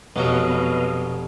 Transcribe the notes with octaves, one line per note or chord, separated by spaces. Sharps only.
F1 B2 F#3 B3 D#5 F5